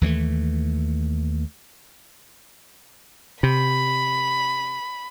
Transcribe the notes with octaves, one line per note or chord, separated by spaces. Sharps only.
D#2 E3 G#3 A3
C3 B5